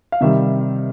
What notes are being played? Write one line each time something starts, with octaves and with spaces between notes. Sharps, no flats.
F5
C3 D#3 G3 E5